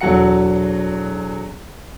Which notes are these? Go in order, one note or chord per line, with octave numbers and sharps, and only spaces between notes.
E1 E2 F#3 A4 F#5 C#7